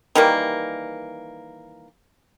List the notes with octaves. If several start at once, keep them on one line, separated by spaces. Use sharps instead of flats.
D#3 E3 G3 A#3